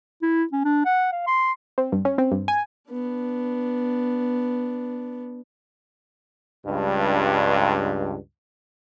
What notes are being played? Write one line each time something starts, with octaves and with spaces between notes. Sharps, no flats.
E4
C#4
D4
F#5
F5
C6
C4
G2
C#4
C4
G2
G#5
B3 D4
C#2 G2